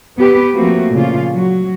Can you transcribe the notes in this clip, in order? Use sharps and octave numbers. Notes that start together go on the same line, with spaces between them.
B3 G4 B4
F3 A3 A#3 C4 F#4
A#2 C#3 F3 G#3 F4
F#3 F#4